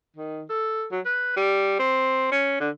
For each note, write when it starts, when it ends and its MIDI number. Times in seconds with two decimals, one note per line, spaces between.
0.17 0.42 51
0.50 0.84 69
0.92 1.00 54
1.06 1.34 71
1.36 1.79 55
1.80 2.30 60
2.32 2.56 61
2.60 2.70 50